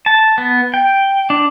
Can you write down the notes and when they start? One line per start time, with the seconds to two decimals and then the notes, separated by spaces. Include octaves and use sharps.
0.06 A5
0.38 B3
0.74 G5
1.30 D4